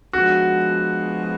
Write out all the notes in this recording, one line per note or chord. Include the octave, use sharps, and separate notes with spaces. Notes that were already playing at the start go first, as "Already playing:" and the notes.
F3 G#3 B3 D4 F#4 G#4